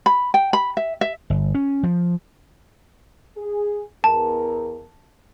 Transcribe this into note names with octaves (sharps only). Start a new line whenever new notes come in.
B5
G5
B5
E5
E5
G1
C#4
F3
G#4
E2 A#4 A5